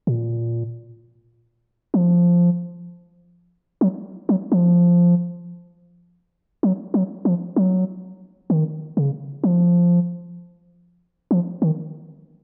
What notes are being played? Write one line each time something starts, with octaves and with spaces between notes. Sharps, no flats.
A#2
F3
F#3
F#3
F3
F#3
F#3
F3
F#3
D#3
C#3
F3
F3
D#3